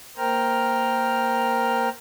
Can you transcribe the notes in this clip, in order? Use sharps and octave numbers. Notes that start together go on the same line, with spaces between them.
A#3 A#4 C5 G5 A#5 F6